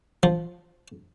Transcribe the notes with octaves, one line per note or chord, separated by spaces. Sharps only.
F3